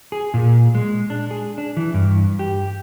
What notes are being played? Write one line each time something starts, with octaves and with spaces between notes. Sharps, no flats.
G#4
A#2
G#3
D4
G#4
D4
E3
G2
G4